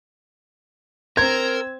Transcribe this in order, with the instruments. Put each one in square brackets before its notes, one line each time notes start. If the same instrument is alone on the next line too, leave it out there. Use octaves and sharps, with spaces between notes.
[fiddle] C4 E6 [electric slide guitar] A#4 [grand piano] G#6